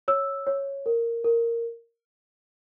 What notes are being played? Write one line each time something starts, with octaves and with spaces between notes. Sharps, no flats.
C#5 E6
C#5
A#4
A#4